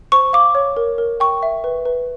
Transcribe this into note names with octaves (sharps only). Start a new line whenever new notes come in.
C5 C#6
F5 D6
C#5
A#4
A#4
G5 C#6
E5
B4
B4